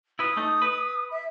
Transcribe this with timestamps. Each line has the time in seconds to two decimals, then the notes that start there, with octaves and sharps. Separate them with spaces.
0.19 E4 B4 D#6
0.37 A3 D#4
0.62 B4
1.11 E5